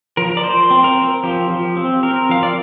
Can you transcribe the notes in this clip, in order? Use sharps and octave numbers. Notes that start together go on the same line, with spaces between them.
F3 A#4
D5
F3 C5
C4
A#4
C4
F3 G4
F3
C4
C4 A#4
F3 F5
D5